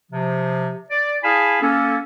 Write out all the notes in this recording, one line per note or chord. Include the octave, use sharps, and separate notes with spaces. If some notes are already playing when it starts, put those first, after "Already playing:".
C3 F3
D5
E4 G#4 F5 G#5 A5 B5
A#3 C#4 A4